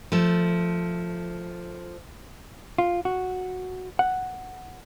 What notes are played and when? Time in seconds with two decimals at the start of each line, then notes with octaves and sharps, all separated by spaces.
0.12 F3 A3 A4
2.78 F4
3.05 F#4
3.99 F#5